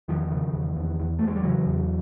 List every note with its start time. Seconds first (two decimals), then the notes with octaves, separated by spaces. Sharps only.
0.08 E2 D#3 F3
0.32 C#3
0.53 E2
0.77 E2
1.00 E2
1.19 E2 A3
1.27 G#3
1.36 G3
1.43 C#3 E3 F#3
1.66 E2